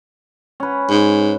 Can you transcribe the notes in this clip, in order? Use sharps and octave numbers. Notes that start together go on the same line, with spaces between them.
C#4 B4
G#2